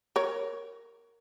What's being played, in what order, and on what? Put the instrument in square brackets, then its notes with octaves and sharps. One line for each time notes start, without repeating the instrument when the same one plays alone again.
[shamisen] A#4 C#5